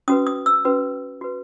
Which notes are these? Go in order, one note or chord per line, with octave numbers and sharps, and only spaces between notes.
C#4 F#4 B4 D#6
D#6
E6
C#4 F#4 B4
F#4 B4